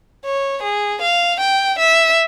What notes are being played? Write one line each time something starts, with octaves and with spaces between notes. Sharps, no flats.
C#5
G#4
F5
G5
E5